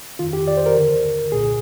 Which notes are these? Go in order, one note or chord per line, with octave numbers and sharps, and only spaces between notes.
F2 D#3 F4
G4
D5
C5
A#4
D#2 D3
C2 A#2 G#4